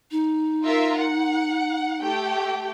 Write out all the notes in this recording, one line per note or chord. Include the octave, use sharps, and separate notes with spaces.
D#4
F4 A#4 E5
F#5
A3 G4 G5